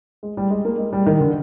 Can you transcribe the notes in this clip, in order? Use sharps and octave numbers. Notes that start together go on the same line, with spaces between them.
G#3
G3
G#3
A#3
G#3
G3
D#3
D3